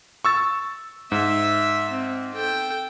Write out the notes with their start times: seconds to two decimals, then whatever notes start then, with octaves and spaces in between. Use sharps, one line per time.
0.25 C#6 E6 A6
1.12 G#2 E5
1.91 C4
2.34 A4 G5